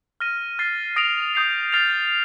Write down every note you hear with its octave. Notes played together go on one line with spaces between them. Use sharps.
F6 A#6 D#7
F6 A6 C7
D#6 A#6 D7 F7
D#6 G6 C7
F6 A6 C7 F7